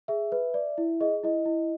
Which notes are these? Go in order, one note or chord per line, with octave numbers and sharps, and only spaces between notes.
G#4 E5
B4
D5
E4
G#4 D#5
E4 D#5
E4